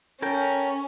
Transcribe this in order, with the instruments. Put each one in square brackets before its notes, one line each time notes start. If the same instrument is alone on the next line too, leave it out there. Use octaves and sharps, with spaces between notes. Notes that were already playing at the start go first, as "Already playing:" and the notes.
[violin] C#4 [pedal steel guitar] A4 A#4 G5